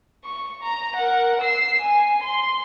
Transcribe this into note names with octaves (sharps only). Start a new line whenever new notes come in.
C#6
A#5
A#4 F#5
E6 C7
G#5
C6